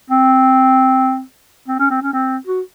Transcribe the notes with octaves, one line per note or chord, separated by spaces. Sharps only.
C4
C4
C#4
C4
C#4
C4
F#4